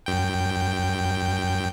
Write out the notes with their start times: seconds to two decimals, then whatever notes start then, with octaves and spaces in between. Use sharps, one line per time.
0.06 F#2 G5